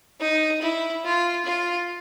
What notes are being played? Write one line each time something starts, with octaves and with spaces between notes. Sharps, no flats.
D#4
E4
F4
F4